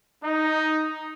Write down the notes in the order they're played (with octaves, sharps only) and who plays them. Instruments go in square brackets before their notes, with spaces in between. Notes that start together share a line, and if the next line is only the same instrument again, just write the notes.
[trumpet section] D#4